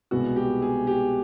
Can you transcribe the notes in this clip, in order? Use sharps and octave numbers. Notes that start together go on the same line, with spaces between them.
C2 B2 G#3 B3 F#4
G4
G#4
G4